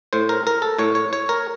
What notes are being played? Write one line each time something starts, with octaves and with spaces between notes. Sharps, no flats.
A2 C5
A#4
A#4
A4
A2 C#5
C#5
C#5
A#4